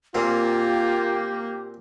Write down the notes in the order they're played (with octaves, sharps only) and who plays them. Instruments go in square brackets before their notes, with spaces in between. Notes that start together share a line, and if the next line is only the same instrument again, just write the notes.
[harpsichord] A#2 C4 [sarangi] A#3 [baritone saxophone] F4 [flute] G4